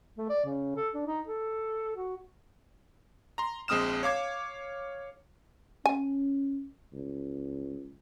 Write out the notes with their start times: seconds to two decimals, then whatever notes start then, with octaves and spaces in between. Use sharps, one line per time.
0.18 A3
0.29 D5
0.45 C#3
0.76 A4
0.94 D4
1.06 D#4
1.27 A4
1.96 F#4
3.38 A#5 C6
3.68 A#1 G#3 C4 D#6 F6 E7
4.03 C#5 F5 D6 G#6
5.86 C#4 G#5
6.93 C#2